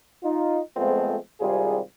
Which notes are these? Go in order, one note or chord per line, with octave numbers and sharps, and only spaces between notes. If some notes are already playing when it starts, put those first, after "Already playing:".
D#4 F4
F2 G#3 A3 B3 C4 F4
G#1 C3 G3 F4 G#4